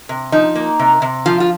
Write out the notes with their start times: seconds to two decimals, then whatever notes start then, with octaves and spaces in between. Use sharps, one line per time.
0.09 C3
0.32 F3 D#4
0.55 A#3
0.79 C3
1.02 C3
1.26 F3 F4
1.40 F4